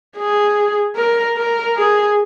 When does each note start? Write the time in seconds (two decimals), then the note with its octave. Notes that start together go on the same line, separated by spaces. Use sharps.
0.17 G#4
0.97 A#4
1.37 A#4
1.76 G#4